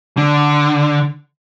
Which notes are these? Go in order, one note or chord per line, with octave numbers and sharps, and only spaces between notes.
D3